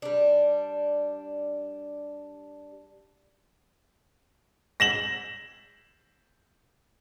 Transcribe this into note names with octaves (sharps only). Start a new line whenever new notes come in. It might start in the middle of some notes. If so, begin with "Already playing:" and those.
G3 D4
A#6 E7 F#7